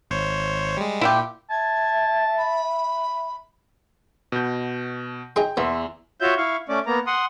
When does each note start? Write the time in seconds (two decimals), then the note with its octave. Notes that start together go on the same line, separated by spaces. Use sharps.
0.11 G#1 C5 C#5
0.77 G3 G#3
1.01 A#2 E4 F4 G4
1.50 E5 A5 G#6
2.38 B5
4.32 B2 G6
5.36 D#4 G#4 G5 C6
5.57 E2 B3 E5 C6
6.20 F4 F#4 C#5 E5 G6
6.38 E4 F5 C#6
6.69 A3 C#4 D5
6.86 A#3 B3 A#5
7.07 F#5 C6 D#6